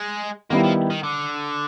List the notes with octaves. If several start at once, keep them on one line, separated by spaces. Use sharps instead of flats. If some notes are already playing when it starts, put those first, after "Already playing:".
Already playing: G#3
D#3 G3 A#3 B3 E4
F3
D#3
D3